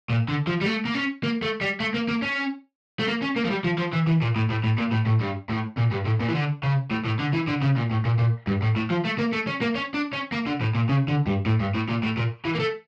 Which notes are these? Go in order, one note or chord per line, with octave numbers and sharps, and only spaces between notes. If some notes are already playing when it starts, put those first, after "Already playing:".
A#2
D3
F3
G3
A3
A#3
C#4
A#3
A3
G3
A3
A#3
A#3
C#4
A3
A#3
C#4
A#3
F3
G3
F3
F3
E3
E3
A#2
A2
A2
A2
A#2
A2
A2
G2
A2
A#2
G2
A2
A#2
E3
D3
C#3
A2
A2
D3
E3
D3
C#3
A#2
A2
A#2
A#2
G2
A2
A2
F3
A3
A#3
A3
C#4
A#3
C#4
D4
C#4
A#3
D3
A2
A#2
C#3
D3
G2
A2
G2
A2
A#2
A2
A#2
E3
A#3
A3